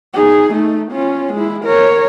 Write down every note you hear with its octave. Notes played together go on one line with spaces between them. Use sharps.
D#4 G#4
A3 D#4
C#4 F4
G#3 E4
A#4 C#5